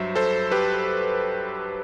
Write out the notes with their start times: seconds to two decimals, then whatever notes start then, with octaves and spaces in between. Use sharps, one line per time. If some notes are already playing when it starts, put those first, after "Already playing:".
Already playing: G2 F#3 C5 E5
0.15 A4 C5
0.51 G4 B4